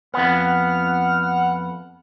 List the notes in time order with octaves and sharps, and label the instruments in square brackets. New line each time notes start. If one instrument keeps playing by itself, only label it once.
[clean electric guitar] F2 B3 [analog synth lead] F#5 [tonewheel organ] F6